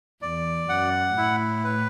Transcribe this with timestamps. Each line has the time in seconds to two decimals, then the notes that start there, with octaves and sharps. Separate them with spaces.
0.22 E2 D5
0.69 F#2 F#5
1.16 A2 E4
1.64 B4